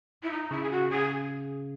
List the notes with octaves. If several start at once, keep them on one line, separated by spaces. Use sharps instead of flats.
E4
D#4
C#3 E4
G#4
F#4
C#3 G#4